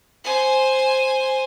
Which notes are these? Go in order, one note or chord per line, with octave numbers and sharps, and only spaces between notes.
C5 G#5